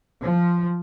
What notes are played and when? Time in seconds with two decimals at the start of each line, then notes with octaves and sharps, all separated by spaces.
0.23 F3